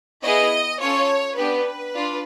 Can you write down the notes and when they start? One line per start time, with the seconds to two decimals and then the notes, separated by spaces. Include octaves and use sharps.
0.24 B3 E4 G#4 D#5
0.81 C#4 F4 A4 C#5
1.38 B3 D4 G4 B4
1.95 D4 F4